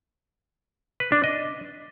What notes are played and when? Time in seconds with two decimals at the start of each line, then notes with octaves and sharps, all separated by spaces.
1.00 B4
1.12 D4
1.24 D#5